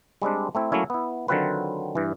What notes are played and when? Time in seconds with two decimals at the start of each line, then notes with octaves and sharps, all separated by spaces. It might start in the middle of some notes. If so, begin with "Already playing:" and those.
0.22 G3 G#3 C4 D4
0.55 A3 C4 E4
0.72 F#3 A3 A#3 C#4 E4
0.90 B3 E4
1.28 D3 D#3 F#3 C4 F4 B4
1.95 G2 E3